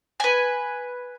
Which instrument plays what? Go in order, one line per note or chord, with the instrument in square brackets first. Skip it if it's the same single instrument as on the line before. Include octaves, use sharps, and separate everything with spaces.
[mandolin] B4 G#5